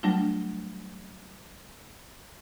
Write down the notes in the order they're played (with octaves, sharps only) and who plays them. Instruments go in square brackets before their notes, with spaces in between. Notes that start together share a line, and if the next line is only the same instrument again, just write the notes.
[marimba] F#3 G3 A3 D4 F4